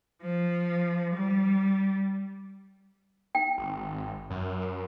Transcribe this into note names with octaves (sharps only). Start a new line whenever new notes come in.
F3
G3
G5
G#1
F#2